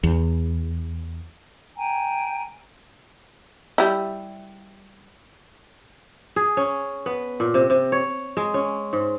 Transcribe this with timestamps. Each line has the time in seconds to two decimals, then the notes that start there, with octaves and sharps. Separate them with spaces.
0.03 E2
1.76 G5 G#5 A#5
3.78 G3 E4
6.36 G#4
6.57 C#4
7.06 B3
7.40 A#2
7.54 C3
7.70 C3
7.92 C#5
8.37 G#3
8.54 C#4
8.93 G#2